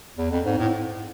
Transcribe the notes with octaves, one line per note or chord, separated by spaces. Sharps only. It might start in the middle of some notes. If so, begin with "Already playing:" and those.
E2
F2
G#2
A2